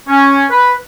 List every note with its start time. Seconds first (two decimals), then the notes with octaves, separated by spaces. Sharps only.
0.08 C#4
0.50 B4